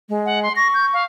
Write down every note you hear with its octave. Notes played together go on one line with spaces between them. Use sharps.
G#3
F#5
C6
C#6 A#6
G6
F5